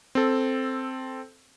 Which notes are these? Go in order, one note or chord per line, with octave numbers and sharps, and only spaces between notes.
C4 A4